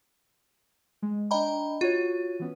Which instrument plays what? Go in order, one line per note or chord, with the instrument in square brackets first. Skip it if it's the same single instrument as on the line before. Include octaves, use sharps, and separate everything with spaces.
[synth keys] G#3
[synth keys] D4 G5 [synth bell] D#5 A#5 B5
[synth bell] F4 [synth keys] F#4 C#5
[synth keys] E3 B3 C#4